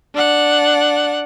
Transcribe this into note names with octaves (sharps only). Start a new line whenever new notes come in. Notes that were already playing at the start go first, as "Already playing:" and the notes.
D4 F#5